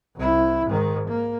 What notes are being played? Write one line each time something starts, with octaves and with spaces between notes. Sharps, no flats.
C2 E4
G#2 D#3
A#3